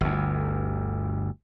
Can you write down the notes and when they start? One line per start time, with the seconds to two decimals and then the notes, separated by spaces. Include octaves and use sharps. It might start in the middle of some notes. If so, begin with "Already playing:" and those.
0.01 G1 D2